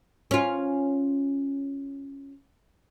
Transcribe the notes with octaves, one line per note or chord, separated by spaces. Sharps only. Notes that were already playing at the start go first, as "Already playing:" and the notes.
C#4 F4